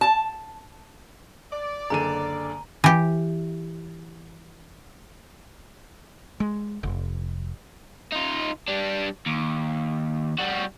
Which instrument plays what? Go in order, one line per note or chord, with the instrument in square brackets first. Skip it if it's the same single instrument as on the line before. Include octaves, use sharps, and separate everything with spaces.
[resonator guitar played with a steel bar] A5
[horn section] D5
[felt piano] F#1 D3 D#7 [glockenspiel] A#5
[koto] E3 G4
[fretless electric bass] G#3
F1
[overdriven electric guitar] D#4 F4
G3 D4
D#2
G3 F#4